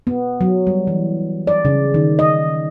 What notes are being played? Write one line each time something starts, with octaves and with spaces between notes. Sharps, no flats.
B3
F#3
G3
E3
D5
C#3
D#3
D#5